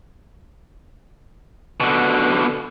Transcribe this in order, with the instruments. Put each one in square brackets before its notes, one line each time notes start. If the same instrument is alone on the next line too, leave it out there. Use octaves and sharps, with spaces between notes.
[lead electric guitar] B2 D3